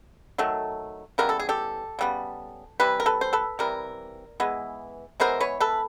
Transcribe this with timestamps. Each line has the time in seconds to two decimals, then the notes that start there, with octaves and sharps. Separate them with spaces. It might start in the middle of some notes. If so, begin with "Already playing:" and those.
0.38 D#3 F#3 A3
1.18 C#3 E3 G3 B3 A#4
1.29 A4
1.40 G#4
1.49 G4 A4
1.99 C#3 E3 G3 B3
2.80 C3 E3 G3 B4
3.00 A#4
3.06 A4 B4
3.21 C5
3.33 A4 B4
3.59 C3 E3 G3 A#4
4.40 E3 G#3 B3
5.20 E3 G#3 B3 A#4 C5
5.40 B4 C#5
5.60 A4 B4